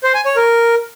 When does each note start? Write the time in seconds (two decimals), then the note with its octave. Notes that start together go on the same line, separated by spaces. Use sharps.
0.04 C5
0.14 G#5
0.25 C#5
0.36 A#4